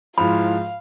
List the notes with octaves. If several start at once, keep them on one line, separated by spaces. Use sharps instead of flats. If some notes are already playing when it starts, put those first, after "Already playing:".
G#2 F3 E4 F5 B5